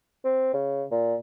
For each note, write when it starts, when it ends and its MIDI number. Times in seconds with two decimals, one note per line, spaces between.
0.24 0.52 60
0.54 0.84 49
0.91 1.16 46